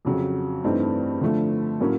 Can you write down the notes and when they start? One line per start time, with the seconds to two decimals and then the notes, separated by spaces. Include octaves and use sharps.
0.05 F2 C#3 F#3
0.64 G2 E3 A3 C4 D#4
1.21 D3 F3 A3
1.80 A2 F#3 A#3 C#4